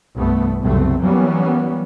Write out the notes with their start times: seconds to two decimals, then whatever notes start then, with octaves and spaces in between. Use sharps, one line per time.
0.15 C2 G2 A3 B3
0.60 F#1 C2 B2 A3 C4
1.02 E3 F#3 G3 A#3 B3 C#4